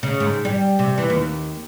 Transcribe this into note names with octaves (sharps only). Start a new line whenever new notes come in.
C#3
G#2
G3
C3
E3
D#2